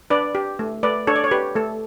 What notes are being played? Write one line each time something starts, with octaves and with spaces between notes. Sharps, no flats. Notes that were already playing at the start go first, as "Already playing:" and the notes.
D4 B4 D5
G4
A3
A3 B4 D5
D4 A4 C#5
D5
C#5
G4 B4
A3 A4